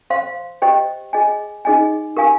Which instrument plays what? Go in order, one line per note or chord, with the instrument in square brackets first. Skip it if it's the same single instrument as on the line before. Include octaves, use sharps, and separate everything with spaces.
[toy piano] C5 F5 C6
G4 C5 D#5 G5
G#4 D#5 G#5
D#4 G#4 D#5 G#5
G4 A#4 F5 G#5